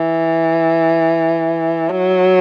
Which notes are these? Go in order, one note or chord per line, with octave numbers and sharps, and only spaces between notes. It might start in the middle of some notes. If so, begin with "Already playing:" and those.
Already playing: E3
F#3